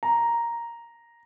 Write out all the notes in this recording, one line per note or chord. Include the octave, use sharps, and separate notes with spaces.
A#5